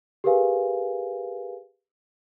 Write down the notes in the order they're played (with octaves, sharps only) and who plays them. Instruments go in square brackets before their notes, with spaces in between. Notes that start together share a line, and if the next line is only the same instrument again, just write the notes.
[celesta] G4 G#4 A#4 B4 F5 G#5